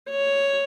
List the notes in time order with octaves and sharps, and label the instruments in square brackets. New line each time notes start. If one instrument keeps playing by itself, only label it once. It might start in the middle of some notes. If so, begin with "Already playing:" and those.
[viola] C#5